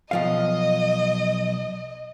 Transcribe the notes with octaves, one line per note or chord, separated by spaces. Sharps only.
B1 F3 D#5 F5